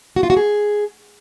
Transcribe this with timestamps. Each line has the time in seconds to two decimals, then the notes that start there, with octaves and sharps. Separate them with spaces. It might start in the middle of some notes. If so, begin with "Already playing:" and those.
0.16 F#4
0.23 F4
0.30 F#4
0.37 G#4